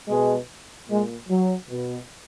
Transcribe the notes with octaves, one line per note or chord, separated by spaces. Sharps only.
B2 G#3
A#2 G#3
F#3
B2